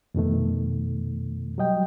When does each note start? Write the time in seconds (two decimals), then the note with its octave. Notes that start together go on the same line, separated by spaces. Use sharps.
0.15 F2 B2 D#3 A3
1.58 F#3 G3 D#5 G5